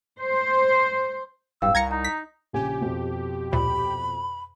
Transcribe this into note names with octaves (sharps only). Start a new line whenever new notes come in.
C5
D1 G2 F5 G5 E6
C2 A#5 G#6 A#6 C#7
D#4 A#5
B6
A#1 C#3 G4 G#5
F2 B2
D2 A#2 B5